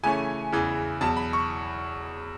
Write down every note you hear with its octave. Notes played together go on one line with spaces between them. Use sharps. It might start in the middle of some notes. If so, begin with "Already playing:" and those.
C#3 E3 A3 C#4 G#5
E2 C#3 E3
E2 B2 F#3 A5
B5
C#6